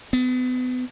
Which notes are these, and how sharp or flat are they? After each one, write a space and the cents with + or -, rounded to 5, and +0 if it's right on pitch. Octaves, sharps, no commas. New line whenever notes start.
B3 +35